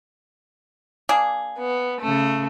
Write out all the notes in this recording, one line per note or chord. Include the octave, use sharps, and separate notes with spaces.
A#3 D4 G#4
B3
C#3 A3